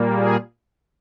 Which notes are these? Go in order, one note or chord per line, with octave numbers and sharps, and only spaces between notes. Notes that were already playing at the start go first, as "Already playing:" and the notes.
Already playing: A#2 G3 A#3
G#4